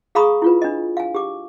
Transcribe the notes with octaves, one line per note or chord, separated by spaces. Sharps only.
G#4 F5 A#5 B5 C#6 D#6
E4 F4 B4
D4 D#5
F5 G#5
G4 D6